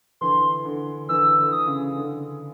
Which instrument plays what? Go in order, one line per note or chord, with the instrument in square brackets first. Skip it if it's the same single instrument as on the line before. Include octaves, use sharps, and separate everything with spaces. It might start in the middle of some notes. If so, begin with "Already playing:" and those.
[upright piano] D3 E3 [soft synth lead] C6
[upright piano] D3
[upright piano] D3 E3 [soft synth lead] E6
[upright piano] D3
[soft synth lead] D#6
[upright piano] C#3
D3